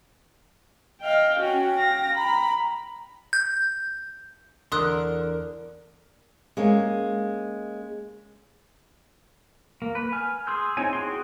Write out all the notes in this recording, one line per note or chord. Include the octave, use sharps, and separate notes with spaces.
D#5 F5 G5
C#4 F#4 G5
F5 A#6
A#5 B5
G6
E2 D3 A#4 C6 D#6 F#6
G#3 A#3 C#4
A#3
B4
G#5 F6
G#4 C6 E6 G6
C4 D#4 E4 C#5 G#5
F#4 G#4 G5 C6